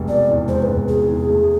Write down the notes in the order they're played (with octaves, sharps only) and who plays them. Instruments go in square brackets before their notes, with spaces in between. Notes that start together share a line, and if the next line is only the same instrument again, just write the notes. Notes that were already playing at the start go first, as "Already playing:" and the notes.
Already playing: [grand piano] F1 G#3
[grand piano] B2 [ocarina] D5
[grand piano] E2
[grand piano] G#3 [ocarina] C5
[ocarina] B4
[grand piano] F1
[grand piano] B2 [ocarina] G#4
[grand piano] E2
A3